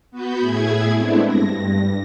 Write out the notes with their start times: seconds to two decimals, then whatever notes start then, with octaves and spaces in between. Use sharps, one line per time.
0.11 B3 F#4 B4 G6
0.40 A2 E4 G#4 G#6
0.97 G#3 A3 B3 C4 D4 E4
1.26 G2 A#6